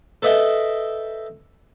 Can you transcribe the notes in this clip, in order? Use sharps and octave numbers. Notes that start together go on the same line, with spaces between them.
A4 B4 D#5 E5 G5